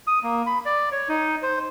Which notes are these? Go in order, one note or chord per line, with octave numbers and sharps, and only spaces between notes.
D#6
A#3
B5
D5
C#5
D#4
C5